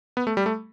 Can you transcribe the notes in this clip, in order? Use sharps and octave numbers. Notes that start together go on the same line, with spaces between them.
B3
A3
G3
A3